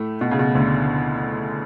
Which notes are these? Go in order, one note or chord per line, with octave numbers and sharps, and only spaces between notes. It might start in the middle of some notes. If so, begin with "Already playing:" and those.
Already playing: A2 A3
B2
C#3
B2
D2 D3